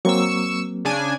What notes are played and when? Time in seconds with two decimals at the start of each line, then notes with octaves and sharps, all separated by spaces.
0.05 F#3 A#3 C4 C#6 E6
0.85 C#3 D4 G#5